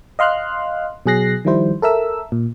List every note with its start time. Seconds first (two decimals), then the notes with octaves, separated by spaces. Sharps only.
0.19 D#5 F5 C6 F6 F#6
1.06 B2 F#3 G#4 F#6 A#6 C7
1.45 D#3 F3 G3 E4 C5
1.82 A4 A#4 E5 E6
2.32 A#2